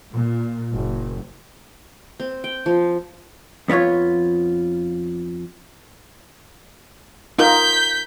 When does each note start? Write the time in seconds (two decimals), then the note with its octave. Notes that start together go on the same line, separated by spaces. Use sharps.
0.12 A#2
0.72 F#1
2.20 C4
2.44 G5
2.66 F3
3.68 F2 B3 D4 F4 C#5
7.39 D#4 F4 A#4 G6 B6